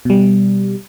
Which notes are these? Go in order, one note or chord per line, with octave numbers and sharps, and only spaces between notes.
B2 G3